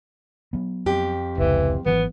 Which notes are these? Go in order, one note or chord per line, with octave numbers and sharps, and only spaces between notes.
F#3 B3
F2 G4
F1 C#2 E3
G#1 E3 F#3 B3